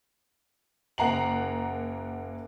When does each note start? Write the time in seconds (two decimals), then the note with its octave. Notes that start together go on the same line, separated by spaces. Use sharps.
0.98 F#1 A#3 F#5 A#5 C7 F#7